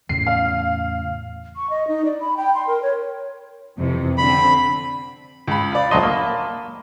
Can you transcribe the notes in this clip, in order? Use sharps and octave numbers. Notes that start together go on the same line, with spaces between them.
E2 A2 C#3 C7
F5
C#6
D#5
D#4
D5
B5
G5
C6
A#4
C#5
F2 C3 E3
D3 C4 B5
C#2 B5
F4 D5
D2 F#3 D#5 A5 B5 C6
A#3